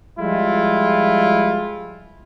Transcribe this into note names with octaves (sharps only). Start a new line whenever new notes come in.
F3 G3 G#3 E4 F4